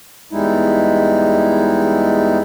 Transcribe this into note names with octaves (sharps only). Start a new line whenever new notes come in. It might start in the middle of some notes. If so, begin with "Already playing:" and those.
E2 G3 G#3 D#4 E4